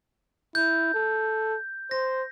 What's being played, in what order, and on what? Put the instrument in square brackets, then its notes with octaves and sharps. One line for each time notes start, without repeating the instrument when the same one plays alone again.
[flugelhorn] E4 [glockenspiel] G6
[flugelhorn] A4
[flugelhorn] C5 [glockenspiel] A#6